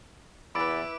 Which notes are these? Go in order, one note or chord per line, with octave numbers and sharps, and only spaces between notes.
E2 E4 B4 B5 D6 E6 A6 D7